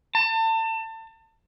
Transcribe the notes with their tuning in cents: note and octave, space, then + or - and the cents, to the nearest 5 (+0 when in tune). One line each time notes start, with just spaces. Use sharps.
A5 +30